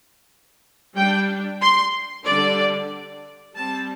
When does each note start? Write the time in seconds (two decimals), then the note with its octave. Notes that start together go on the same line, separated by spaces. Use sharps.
0.95 G3 D4 G5
1.61 C6
2.25 D3 G3 D4 D5
3.55 G3 C4 A5